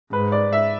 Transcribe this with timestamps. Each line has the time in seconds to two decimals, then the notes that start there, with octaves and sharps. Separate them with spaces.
0.12 G#2 B4
0.32 D5
0.53 E5